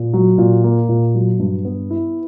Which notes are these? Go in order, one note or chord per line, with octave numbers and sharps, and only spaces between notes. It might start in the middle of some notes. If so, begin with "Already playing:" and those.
Already playing: A#2
F#3
A#2
A#3
A#2
F#3
G2
B3
E4